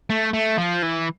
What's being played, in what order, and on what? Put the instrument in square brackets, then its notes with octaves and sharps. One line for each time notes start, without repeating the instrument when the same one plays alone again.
[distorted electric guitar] A3
A3
F3
E3